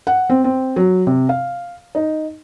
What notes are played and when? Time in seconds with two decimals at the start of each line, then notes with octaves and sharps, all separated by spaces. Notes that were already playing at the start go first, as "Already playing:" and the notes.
0.07 F#5
0.29 C4
0.44 C4
0.76 F#3
1.07 C3
1.29 F5
1.95 D#4